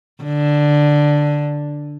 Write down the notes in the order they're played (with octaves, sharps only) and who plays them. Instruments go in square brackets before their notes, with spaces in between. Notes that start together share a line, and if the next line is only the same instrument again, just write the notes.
[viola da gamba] D3